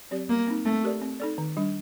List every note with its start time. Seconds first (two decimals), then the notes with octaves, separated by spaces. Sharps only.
0.11 F#3 C4 G4 D5
0.29 G3 A#3
0.47 C4 D#4
0.65 A3 C4
0.84 G4 A#4 D5
1.02 C4
1.20 D#4 A4 D5
1.38 D#3
1.57 G3 D4